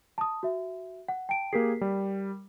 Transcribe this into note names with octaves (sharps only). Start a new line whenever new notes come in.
A5 D#6
F#4 E5
F#5
G5 A5 D7
A#3 G4 G#4 A#4 B6 C7
G3